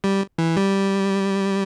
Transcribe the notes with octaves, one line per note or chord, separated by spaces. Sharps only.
G3
E3
G3